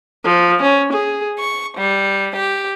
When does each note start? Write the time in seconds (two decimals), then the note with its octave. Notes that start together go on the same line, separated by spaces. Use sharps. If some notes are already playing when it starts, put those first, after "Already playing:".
0.25 F3
0.62 C#4
0.92 G#4
1.40 C#6
1.78 G3
2.38 G4